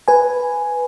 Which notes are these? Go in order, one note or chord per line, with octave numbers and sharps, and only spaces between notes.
B4 G#5